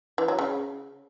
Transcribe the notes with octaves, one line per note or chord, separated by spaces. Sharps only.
E3
F#3
C#3